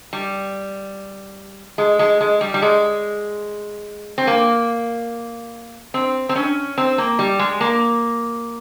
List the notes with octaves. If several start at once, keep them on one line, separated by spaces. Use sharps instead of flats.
G3
G#3
G#3
G#3
G3
G3
G#3
C4
A#3
C4
C4
C#4
C4
A#3
G3
G#3
A#3